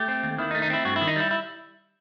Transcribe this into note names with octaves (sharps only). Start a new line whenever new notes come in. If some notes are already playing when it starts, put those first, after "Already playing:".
Already playing: A3 G4
C4
D#2
D#3 E4
D#4
A3
D#4
C4 E4
G2 F#4
E4
D#3
D#4
G3 E4
E4